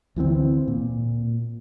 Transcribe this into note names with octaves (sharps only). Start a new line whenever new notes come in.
D2 E3 F3 C4
A#2